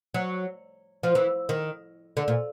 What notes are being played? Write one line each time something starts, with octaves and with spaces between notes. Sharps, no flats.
F#3
F3
E3
D#3
D3
A#2